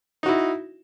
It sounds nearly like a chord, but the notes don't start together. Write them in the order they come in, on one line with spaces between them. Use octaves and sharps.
D#4 F#4 E4